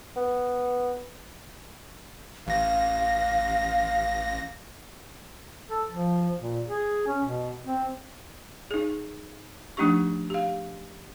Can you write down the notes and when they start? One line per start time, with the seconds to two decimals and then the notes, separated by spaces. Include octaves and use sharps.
0.16 B3
2.47 A1 F5 A#6
5.70 A4
5.89 F3
6.39 A#2
6.67 G#4
7.07 C#4
7.24 B2
7.65 C4
8.71 D#4 G#4
9.77 F3 A3 D4 D#4 G4 C#6
10.30 G4 F5